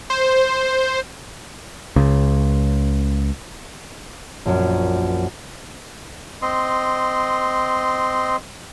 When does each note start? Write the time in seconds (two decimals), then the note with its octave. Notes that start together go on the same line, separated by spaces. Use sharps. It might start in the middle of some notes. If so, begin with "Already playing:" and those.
0.10 C5
1.96 C#2 C#3
4.45 A#1 F#2
6.42 C4 D#5 C6